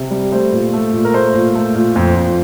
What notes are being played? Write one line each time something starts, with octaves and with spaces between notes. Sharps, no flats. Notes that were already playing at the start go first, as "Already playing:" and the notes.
Already playing: C3
G3
A3 C5
A#2
A3
A#2
A#4
A3 C5
A#2
A3
A#2
F2
F2